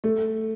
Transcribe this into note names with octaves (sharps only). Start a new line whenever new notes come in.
A3